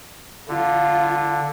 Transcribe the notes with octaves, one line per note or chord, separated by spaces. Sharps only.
D3 F4